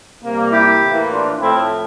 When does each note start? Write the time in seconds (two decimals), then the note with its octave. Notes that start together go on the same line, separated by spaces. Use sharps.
0.23 C3 G3 A#3
0.52 E4 G4
0.81 A2 E3 A#3
1.10 D4 F4
1.40 A2 F3 A3 C4 E4